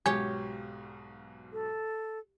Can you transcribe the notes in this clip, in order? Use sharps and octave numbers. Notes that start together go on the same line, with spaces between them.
B1 G#2 B2 G4 C#5 G#5
A4